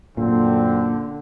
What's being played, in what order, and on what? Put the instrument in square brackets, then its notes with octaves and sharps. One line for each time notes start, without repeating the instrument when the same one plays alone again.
[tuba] F#2 [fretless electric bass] A#2 [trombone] D3 [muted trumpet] C4